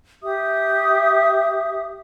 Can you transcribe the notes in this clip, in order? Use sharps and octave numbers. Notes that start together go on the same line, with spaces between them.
G4 E5 D#6